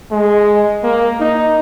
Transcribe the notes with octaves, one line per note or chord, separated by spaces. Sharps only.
G#3
A#3
D#4